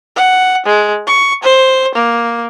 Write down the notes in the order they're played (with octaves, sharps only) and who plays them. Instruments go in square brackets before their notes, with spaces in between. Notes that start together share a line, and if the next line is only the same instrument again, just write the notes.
[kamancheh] F#5
G#3
C#6
C5
A#3